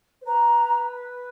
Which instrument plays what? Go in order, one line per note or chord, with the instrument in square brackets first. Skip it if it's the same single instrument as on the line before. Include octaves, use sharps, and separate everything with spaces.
[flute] C5
[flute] B4 [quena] A#5